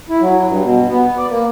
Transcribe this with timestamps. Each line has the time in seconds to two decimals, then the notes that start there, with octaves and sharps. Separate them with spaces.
0.10 E4
0.21 F#3
0.48 G2
0.62 B2
0.89 B3
1.17 D5
1.30 A#3